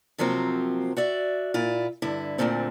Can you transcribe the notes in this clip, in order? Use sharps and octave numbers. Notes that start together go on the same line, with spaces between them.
C3 F3 F#3 A#3 C4
F#4 D5 E5
A#2 E4 F4
G2 D3 E4
D2 G2 A#2 D3 C4